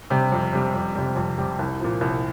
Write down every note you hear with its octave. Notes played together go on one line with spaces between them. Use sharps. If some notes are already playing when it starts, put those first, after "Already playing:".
C3 G3
F2
C3 G3
F2
C3 G3
F2
C3 G3
C2
A#2 F3
C2